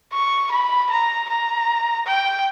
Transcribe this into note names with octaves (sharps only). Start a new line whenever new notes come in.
C#6
B5
A#5
A#5
G5